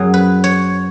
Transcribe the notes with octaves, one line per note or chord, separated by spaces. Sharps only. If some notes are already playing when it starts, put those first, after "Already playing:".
Already playing: F#2 F#3 G#4
B4
C#5